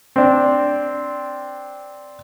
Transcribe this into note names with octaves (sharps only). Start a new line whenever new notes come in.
C4 D4